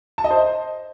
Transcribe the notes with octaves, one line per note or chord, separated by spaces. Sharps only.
A5
D#5
C5